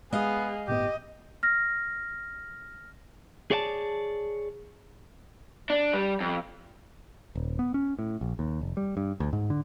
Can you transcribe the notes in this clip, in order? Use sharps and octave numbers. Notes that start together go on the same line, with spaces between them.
G#3 B3 G#4 D#5 F5
G1 A2 B3 G4 D#5
F6 A#6
G#4 C#5 D5 F#5 A5
D4
G3
F2
D#1
B3
C#4
A2
A#1
D#2
F1
G3
G2
D2
G#2
D3